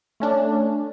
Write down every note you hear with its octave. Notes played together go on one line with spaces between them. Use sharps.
A3 C#4 D4